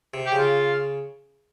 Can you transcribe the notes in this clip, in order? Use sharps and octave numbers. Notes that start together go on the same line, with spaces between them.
C3
G4
C#3
F4